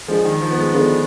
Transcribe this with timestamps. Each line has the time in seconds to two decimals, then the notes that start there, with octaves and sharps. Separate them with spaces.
0.08 F3 G#3 D4 G#4
0.25 D#3
0.41 F3
0.51 B3
0.58 G#3
0.74 D3 G#3 B3 D4 F4